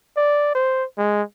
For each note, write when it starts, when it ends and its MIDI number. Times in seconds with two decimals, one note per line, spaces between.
0.17 0.52 74
0.55 0.85 72
0.98 1.22 56